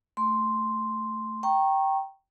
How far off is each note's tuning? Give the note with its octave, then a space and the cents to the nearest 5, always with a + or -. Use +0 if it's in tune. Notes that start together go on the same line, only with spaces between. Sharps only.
A3 +0 C6 +0
G5 -10 A#5 +0 C#6 -25